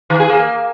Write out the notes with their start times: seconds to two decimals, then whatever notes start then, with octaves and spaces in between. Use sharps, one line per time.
0.10 D#3
0.20 G#4
0.29 A#3